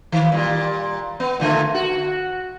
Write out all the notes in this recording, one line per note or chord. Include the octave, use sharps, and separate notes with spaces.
D#3
A#2 G3
B3
A#2 D3 A3
F#4